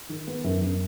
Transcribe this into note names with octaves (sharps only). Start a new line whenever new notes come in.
D#3
B3
F#2
F#2